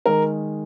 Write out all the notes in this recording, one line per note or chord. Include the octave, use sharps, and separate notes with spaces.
D#3 G#3 A#4